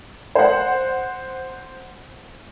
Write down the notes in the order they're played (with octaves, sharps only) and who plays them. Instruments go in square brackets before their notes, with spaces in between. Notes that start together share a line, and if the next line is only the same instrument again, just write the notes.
[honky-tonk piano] C5 F#5